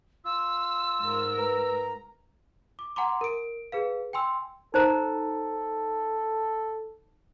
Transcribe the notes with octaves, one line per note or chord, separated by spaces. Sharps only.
F4 E6
G#2 A#4
B4 A#5
D6
F#5 G#5 A#5 C6 D6
A#4 D7
G#4 B4 F5
G5 G#5 C6 E6
D#4 A4 C5 A#5